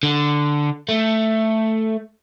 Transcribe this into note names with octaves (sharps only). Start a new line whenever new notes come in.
D3
A3